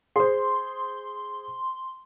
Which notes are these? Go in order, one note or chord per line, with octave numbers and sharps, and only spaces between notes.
G#4 C5 C6